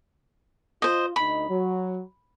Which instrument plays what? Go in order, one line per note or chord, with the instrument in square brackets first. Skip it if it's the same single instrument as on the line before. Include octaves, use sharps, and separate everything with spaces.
[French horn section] F4 [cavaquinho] C5 D#5
[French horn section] D2 D#4 D#5 [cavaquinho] B5
[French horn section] F#3